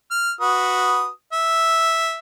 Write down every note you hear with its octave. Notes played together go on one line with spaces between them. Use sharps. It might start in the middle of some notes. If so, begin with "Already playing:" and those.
F6
F#4 B4 D#6
E5